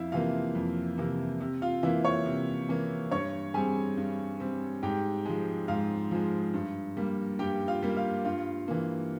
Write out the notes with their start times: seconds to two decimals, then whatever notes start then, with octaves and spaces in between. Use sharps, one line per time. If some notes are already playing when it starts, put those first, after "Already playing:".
Already playing: F2 E4 E5 F5
0.12 C3 E3 A#3 F4 F5
0.55 F2
0.98 C3 E3 A#3
1.41 C3
1.62 F4 F5
1.83 E3 E4 E5
1.86 A#3
2.05 C#5 C#6
2.26 C3
2.69 E3 A#3
3.11 G2 C#5 C#6
3.54 G3 C4 G#4 G#5
3.97 G2
4.40 G3 C4
4.83 G#2 G4 G5
5.25 F3 G#3
5.68 G#2 F4 F5
6.11 F3 G#3
6.54 G2
6.97 G3 A#3
7.39 G2 G4 G5
7.68 F4 F5
7.83 G3 A#3
7.96 F4 F5
8.25 G2 F4 F5
8.68 E3 A#3